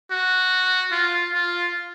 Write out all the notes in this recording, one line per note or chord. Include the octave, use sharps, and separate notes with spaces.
F#4
F4
F4